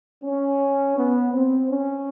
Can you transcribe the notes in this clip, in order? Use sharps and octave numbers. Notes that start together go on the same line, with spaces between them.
C#4
B3
C4
C#4